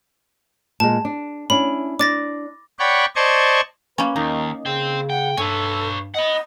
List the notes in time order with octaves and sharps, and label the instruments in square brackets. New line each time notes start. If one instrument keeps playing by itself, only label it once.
[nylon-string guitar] A#2 G#3 [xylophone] A5
[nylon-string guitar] D4
[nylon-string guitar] C#4 D4 E4 [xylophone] B5
[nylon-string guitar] D4 D5 [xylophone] D6 A6 A#6
[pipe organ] C#5 D5 F#5 G5 B5 C#6
C5 D5 D#5 A5 C#6 G#6
[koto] A#3 C#4 [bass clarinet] B4
[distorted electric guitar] D#2 [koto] D#4 [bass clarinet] A#4
[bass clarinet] C#3 [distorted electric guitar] C5 G5
[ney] F#5 [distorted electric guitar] G5
[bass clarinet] G2 [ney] A4 [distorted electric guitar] B4 C#5 [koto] G#5
[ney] D#5 [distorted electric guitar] F#5 B5